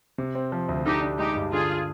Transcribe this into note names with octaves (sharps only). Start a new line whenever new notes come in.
C3
C4
F3
D2
D3 D#4 G4
D4
G#3 D#4 G4
G2
D3 F4 G#4